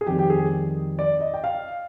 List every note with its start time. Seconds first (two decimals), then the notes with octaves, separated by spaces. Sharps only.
0.01 G#4
0.06 F2 D#3 G3 C4 G4
0.19 G4
0.30 G#4
0.99 D5
1.20 D#5
1.34 G5
1.44 F5